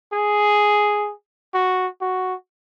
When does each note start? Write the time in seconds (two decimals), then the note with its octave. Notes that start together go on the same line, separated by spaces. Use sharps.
0.13 G#4
1.54 F#4
2.01 F#4